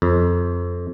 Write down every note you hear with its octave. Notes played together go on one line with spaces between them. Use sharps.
F2